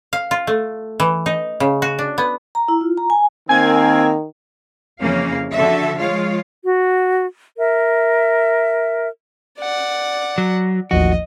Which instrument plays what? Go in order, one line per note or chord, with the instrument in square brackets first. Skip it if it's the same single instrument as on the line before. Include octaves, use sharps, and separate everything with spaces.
[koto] F5
F4
A3
E3
D#4
C#3
F#4
D4
B3
[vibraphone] A#5
E4
F4
A#5
G#5
[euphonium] D#3 [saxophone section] A#3 C4 [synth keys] G#5 G#6
[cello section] F2 C#3 E3 A#3 C#4 F5
D3 F3 F#4 A4 E5
F3 G#3 F4 C#5 F5
[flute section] F#4
A#4 E5
[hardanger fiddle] D5 F#5
[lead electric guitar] F#3
[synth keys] A1 D#2 F3 [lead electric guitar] F#4 [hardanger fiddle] D#5